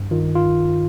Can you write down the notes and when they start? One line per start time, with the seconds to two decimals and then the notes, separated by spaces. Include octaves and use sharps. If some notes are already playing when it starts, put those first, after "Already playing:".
Already playing: G2
0.11 D#3 F4
0.36 F4